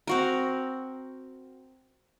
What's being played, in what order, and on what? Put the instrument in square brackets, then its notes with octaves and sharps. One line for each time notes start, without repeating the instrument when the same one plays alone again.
[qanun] C4 F#4 A#4